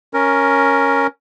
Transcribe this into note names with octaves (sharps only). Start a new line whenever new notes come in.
C#4 A#4